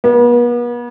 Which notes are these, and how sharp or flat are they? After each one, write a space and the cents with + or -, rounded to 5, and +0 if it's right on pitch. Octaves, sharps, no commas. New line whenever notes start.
B3 -40